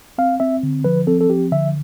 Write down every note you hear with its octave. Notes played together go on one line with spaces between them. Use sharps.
C4 F5
C4 E5
D3
F3 B4
C4 A4
A4
F3 G4
D3 E5